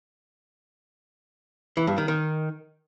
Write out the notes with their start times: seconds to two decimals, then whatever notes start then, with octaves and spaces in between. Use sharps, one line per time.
1.77 E3
1.87 G2
1.98 D#3
2.08 D#3